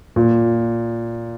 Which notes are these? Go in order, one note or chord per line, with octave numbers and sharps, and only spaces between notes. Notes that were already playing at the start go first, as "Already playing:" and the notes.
A#2